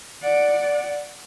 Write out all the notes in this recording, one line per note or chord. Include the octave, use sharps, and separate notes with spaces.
D5 F#5